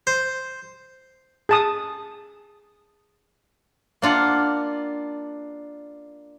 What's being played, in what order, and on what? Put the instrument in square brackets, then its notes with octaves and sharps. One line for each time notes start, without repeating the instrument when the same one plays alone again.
[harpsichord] C5
[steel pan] G#4 A5 D#6
[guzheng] A#3 D4 F4 F#5